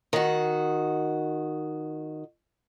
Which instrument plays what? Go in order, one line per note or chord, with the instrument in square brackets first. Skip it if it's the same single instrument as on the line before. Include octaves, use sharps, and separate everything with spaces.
[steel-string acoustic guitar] D#3 F#4